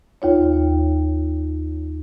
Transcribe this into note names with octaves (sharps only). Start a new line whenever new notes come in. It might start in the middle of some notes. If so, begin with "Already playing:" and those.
D#2 F4 C#5